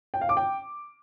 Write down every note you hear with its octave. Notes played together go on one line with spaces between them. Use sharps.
G5
F5
D6
G5